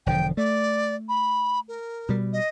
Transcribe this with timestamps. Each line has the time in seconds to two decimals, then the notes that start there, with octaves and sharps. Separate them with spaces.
0.06 E1 D3 F3 G5
0.37 A3 D5
1.08 B5
1.68 A#4
2.09 B2 G3
2.33 D#5